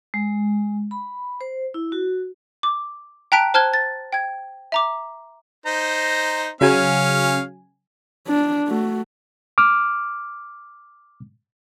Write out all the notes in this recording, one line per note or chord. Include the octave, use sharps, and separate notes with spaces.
G#3
B5
C5
E4
F#4
D6
G5 A5 A#5 F#6 B6 D7
C5 A5 F6 F#6 G#6 G7
A6
G5 G#6
E5 A#5 D6
D#4 C5 A#5
C#3 F#3 C#4 F5 G#5
D4
A3 F#4
D6 F6